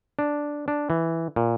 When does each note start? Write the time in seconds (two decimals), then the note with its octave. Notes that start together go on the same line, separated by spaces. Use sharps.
0.19 D4
0.68 D4
0.90 E3
1.36 A#2